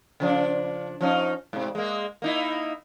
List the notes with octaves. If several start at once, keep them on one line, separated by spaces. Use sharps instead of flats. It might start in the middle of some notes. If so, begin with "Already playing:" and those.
C#3 F3 D4
F3 C#4 D#4
G#2 C3
G#3 A#3
A#3 D#4 E4